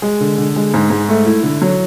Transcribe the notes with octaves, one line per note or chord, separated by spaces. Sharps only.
G#3
D3
D3
G#3
G#2
G#2
A3
E4
D3
F#3